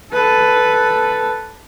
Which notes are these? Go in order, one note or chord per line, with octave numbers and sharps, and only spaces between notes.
A4 B4